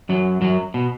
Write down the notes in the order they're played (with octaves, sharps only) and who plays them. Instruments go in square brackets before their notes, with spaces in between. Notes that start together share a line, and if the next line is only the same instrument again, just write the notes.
[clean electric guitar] F#2 F#3
F#2 F#3
B2